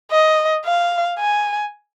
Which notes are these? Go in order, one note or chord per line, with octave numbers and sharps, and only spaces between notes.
D#5
F5
G#5